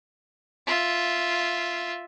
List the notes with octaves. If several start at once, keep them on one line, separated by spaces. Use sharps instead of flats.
F4 E5